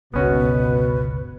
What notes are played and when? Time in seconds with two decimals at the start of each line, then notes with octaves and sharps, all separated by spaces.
0.14 G1 C#2 B2 B3 C#4 F#4 B4